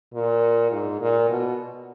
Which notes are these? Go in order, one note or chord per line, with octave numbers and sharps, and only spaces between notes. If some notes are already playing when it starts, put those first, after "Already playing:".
A#2
G#2
A#2
B2